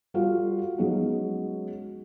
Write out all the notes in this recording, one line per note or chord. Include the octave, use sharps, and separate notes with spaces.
G3 F4 F#4 A4 F5
F#3 G#3 B3 C#4 D#4